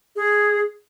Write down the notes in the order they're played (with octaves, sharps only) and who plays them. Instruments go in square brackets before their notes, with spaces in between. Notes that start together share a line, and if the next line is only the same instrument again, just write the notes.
[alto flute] G#4